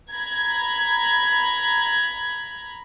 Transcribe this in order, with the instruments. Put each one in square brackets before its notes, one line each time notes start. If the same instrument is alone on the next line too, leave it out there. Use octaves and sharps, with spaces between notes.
[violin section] A#5 B5 G#6